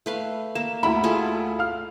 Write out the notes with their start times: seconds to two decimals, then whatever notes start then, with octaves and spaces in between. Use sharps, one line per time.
0.06 A3 B4 F5
0.55 A#3 E7
0.83 D2 E4 E5 B5
1.04 F4 G#4 A4
1.59 F5 F6